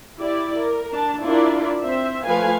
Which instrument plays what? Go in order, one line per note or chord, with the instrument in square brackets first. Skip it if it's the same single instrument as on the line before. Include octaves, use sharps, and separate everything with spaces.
[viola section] E4 G4 D5
A#4
D4 A5
D4 E4 F4 A#4 D5
C4 C5 E5
F3 A3 B4 F5 G#5